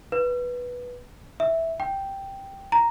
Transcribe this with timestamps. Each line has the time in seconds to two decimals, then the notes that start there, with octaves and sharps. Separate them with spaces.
0.12 B4
1.40 E5
1.80 G5
2.72 A#5